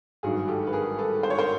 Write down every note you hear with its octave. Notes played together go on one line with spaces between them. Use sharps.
G#1 G2 D#3 F#3 F#4 G#4
G4 A4
B4
G#4 A#4
A4 B4
C5
C#5
A#4 C5